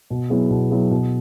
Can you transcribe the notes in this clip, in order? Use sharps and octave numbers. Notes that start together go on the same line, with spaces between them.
B2
F#3 B3 E4 G#4
B2
F#3 B3 E4 G#4
B2